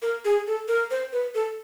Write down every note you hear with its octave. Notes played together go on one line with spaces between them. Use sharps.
A#4
G#4
A4
A#4
C5
B4
A4